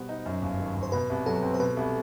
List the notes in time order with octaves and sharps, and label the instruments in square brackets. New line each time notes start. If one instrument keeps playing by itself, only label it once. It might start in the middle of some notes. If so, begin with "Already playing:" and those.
Already playing: [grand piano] B2 G3 B3 [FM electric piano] C5
[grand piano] D#4
F#2
G1
D#3
G1
[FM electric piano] C5
[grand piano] B2 [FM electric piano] B4
[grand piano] C2
[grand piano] F#3 [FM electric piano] A4
[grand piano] C4
[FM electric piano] C5
[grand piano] B2 [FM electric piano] B4
[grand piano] C2